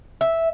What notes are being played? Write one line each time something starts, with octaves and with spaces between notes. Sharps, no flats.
E5